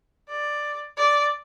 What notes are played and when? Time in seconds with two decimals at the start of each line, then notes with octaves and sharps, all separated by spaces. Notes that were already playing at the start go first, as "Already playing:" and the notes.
0.28 D5
0.97 D5